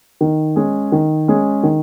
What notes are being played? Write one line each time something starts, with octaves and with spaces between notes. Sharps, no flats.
D#3
G#3 C#4 G#4
D#3
G#3 C#4 G#4
D#3